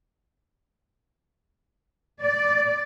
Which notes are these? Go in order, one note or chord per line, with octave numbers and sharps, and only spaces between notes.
D5